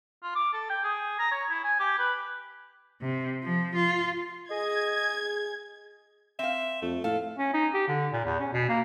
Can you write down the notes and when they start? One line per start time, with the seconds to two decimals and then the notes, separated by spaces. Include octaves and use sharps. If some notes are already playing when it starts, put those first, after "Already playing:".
0.23 F4
0.35 D6
0.53 A4
0.70 G5
0.84 G#4
1.19 A#5
1.31 C#5
1.50 E4
1.63 G#5
1.79 G4
1.99 B4
3.02 C3
3.43 F3
3.76 F4
4.50 G#4 D#5 G#6
6.39 C4 E5 F5
6.82 F2 A3
7.04 A2 A4 F5
7.37 C#4
7.54 D#4
7.74 G4
7.88 D3
8.12 A#2
8.25 E2
8.40 C#4
8.53 B2
8.69 A#3